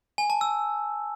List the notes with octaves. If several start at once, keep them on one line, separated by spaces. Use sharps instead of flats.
G#5
A5
E6